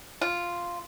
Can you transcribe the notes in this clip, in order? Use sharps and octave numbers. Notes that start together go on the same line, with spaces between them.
F4